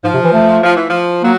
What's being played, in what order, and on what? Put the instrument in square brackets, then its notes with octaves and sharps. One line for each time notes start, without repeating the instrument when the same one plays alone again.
[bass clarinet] G#2 [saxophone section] F3
[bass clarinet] C3
E3
A3
[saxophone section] F3
E3
F3
[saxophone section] F#3 [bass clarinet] A#3